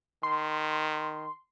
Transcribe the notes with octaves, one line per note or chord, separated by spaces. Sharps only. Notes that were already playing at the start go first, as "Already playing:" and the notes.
D#3 C6